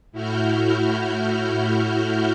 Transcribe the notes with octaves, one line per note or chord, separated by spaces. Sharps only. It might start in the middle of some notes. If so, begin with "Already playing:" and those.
A2 E4 F#4 F6 G6